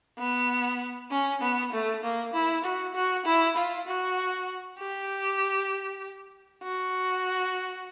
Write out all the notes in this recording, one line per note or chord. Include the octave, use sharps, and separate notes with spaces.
B3
C#4
B3
A3
A#3
E4
F#4
F#4
E4
F4
F#4
G4
F#4